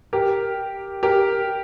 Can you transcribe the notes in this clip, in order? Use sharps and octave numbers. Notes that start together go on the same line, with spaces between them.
G4 A#4
G4 A#4